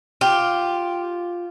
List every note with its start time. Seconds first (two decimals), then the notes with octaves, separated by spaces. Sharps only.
0.21 F4 G4